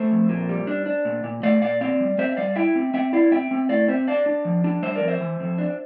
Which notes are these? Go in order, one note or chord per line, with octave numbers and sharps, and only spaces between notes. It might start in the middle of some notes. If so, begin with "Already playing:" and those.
Already playing: A3 C5 E5
F2
A#2
G3
D4
D4
A#2
A#2
A3 D5 F5
A#2 D5 F5
C4 D5 F5
G3
C4 C5 E5
E5
G3 D5 F5
E4 E5 G5
C4
C4 E5 G5
E4 D5 F5
C4 E5 G5
C4
A2 D5 F5
C4 C5 E5
D4 D5 F5
D4
F3
D4
G3 C5 E5
A#4 D5
F2
C5 E5
E3
F2
D4